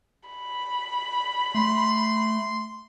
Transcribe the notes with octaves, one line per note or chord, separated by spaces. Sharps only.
B5
A3 C6